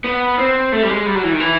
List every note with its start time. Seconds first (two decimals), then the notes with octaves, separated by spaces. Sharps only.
0.04 B3
0.38 C4
0.72 A3
0.83 G3
0.89 G#3
1.06 G3
1.15 F#3
1.23 E3
1.32 D#3
1.40 E3